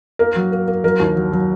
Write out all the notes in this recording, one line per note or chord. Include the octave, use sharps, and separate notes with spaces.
A#3 A#4
F#3
A#3
A#3
F#3 A#4
D#2
F#3
F#3